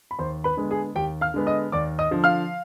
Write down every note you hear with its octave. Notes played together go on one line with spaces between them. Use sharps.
B5
D#2 C5 C6
B4 B5
D3 G#3 B3
G#4 G#5
D#2 G4 G5
F5 F6
D3 G#3 B3
D#5 D#6
D#2 D5 D6
D#5 D#6
D3 F3
F5 F6